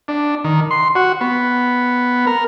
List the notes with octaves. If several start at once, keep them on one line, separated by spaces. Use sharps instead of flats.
D4
D#3
C6
F#4
B3
A#4